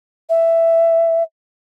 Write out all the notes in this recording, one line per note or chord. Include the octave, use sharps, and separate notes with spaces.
E5